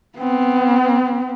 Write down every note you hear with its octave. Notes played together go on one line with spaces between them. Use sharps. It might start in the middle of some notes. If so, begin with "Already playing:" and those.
B3 C4